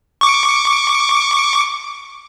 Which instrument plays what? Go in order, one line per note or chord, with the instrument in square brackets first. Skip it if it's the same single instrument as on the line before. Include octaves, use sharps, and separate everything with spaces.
[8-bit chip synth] C#6 D6